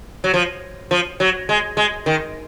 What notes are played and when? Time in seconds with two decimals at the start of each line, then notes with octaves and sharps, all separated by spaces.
0.24 F#3
0.34 F3
0.91 F3
1.20 F#3
1.49 G#3
1.77 G#3
2.06 D#3